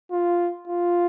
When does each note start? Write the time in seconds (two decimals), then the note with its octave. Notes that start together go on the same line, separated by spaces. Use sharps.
0.12 F4
0.68 F4